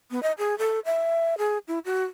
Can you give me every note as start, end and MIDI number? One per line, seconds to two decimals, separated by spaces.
0.11 0.22 59
0.23 0.32 75
0.38 0.58 68
0.58 0.80 69
0.85 1.38 76
1.38 1.58 68
1.68 1.79 64
1.85 2.04 66